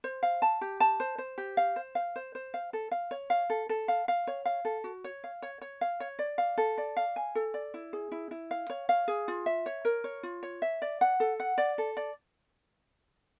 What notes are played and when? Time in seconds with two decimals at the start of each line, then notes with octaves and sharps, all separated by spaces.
0.04 C5
0.23 F5
0.42 A5
0.61 G4
0.80 A5
1.00 C5
1.18 C5
1.38 G4
1.57 F5
1.76 C5
1.95 F5
2.16 C5
2.35 C5
2.54 F5
2.73 A4
2.91 F5
3.11 C#5
3.30 F5
3.50 A4
3.69 A4
3.88 F5
4.08 F5
4.27 C#5
4.45 F5
4.65 A4
4.84 F#4
5.04 C#5
5.24 F5
5.42 C#5
5.62 C#5
5.81 F5
6.00 C#5
6.19 D5
6.38 F5
6.58 A4
6.78 D5
6.97 F5
7.16 G#5
7.35 A4
7.54 D5
7.74 E4
7.93 G#4
8.12 E4
8.31 E4
8.51 F5
8.70 C#5
8.89 F5
9.08 G#4
9.28 F4
9.46 E5
9.66 C#5
9.85 A#4
10.04 C#5
10.23 F4
10.43 C#5
10.62 E5
10.82 D5
11.01 F#5
11.20 A4
11.40 F#5
11.58 D5
11.78 A4
11.97 D5